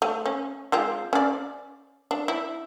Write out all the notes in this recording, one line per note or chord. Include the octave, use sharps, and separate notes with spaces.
A3
C#4
G#3 C4 F4
C#4 D5
D4
E4